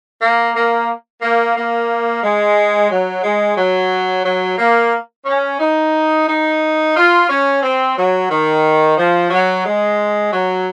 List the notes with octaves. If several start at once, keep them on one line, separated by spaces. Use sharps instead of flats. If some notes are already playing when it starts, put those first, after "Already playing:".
A#3
A#3
A#3
A#3
G#3
F#3
G#3
F#3
F#3
A#3
C#4
D#4
D#4
F4
C#4
C4
F#3
D#3
F3
F#3
G#3
F#3